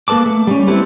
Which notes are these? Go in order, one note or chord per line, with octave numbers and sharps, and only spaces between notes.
A#3 A4 B4 A5 D6
A3
G3 C#4
C4 E4 G4 A4 B4